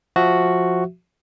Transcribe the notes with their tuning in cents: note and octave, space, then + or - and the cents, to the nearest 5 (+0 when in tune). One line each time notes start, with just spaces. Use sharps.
F3 +10 F#4 +0 E5 +0